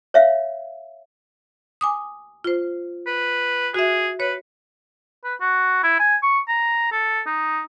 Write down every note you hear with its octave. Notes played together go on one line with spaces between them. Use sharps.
C#5 E5 F5
G#5 D6 D#6
F4 C5
B4
F#4 G#4 E5
B4 C#5
B4
F#4
E4
G#5
C#6
A#5
A4
D#4